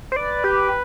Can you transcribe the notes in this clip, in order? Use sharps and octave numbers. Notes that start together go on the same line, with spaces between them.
C5
B4 D5
G4